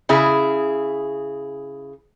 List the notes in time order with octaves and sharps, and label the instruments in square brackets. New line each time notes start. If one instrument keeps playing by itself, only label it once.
[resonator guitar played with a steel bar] C#3 E4 G#4